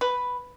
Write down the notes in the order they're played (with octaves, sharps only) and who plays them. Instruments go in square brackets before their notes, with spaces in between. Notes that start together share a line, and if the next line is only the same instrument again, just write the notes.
[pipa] B4